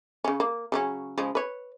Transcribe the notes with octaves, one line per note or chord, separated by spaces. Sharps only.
C#3 C#4
A#3
C#3 F#3 C#4
C#3 F3 G#3
B4 C#5